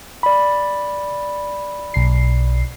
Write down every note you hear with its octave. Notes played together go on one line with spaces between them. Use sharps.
D5 B5
B1 C7